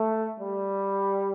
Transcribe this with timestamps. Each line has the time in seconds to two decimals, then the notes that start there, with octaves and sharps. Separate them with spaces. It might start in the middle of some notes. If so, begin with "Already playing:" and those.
Already playing: A3
0.39 G3